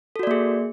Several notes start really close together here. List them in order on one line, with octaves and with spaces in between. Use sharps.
A4 F#4 D5 A#3 G#4